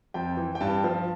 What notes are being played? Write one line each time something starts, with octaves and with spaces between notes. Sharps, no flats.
F2 G5
E3
G5
G2 A5
F3